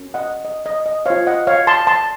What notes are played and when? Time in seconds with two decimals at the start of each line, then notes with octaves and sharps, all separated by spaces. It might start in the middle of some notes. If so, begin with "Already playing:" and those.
Already playing: C#4 F#4 A#4
0.14 D#5 F#5
0.45 D#5
0.66 D#5
0.86 D#5
1.06 F4 C5 C#5 F5
1.27 D#5 F#5
1.47 C#5 F5
1.67 A5 C6
1.87 A5 C6